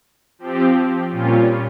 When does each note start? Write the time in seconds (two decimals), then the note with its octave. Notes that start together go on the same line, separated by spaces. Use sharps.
0.39 F3 C4 G4
1.08 A#2 G3 C#4 F4